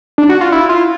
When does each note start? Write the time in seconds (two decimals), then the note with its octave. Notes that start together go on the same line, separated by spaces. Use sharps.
0.18 D4
0.29 F#4
0.41 F4
0.52 E4
0.69 F4